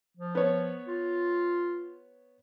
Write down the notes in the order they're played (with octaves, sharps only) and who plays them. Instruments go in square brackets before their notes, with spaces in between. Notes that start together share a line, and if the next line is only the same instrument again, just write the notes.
[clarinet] F3
[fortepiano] B3 C#5
[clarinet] F4